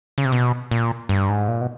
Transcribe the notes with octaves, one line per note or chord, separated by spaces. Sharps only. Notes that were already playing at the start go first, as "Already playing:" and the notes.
C#3
C3
B2
A#2
G2
G#2
A#2
B2